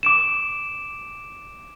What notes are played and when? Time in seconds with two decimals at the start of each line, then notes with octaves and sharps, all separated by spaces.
0.03 D6 D7 E7